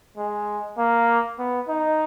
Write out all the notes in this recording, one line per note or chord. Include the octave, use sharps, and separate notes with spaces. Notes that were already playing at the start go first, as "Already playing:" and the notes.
G#3
A#3
B3
D#4